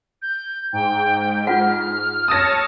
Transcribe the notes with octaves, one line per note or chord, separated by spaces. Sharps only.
G6
G#2 G5
F4 F#5 F6
C#5 A5 D#6 E6 A#6